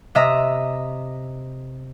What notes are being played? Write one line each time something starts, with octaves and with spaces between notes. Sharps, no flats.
C3 D#5 E5 A#5